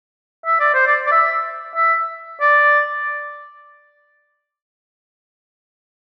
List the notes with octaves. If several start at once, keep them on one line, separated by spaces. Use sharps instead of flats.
E5
D5
C5
D5
D5
E5
E5
D5